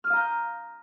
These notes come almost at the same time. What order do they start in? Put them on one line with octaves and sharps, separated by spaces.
F6 D#6 F5 A#5 G6